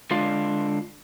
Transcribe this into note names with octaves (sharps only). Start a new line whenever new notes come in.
D3 G#3 D4 F4 F5